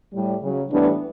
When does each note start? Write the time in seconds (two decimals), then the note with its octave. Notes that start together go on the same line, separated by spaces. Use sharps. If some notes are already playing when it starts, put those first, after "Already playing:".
0.14 A2 G3
0.42 C#3 F#3
0.70 A2 E3 G3 B3 D4